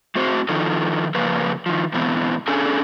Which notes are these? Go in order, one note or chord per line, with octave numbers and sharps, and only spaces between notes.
A2 C4 F#4 C5
D#3 F3 D#4 F4 A4
C#3 F3 A#3 B4
D#3 F3
G#2 B2 E3 B3 C4
C#4 D4 G#4 A4 G#5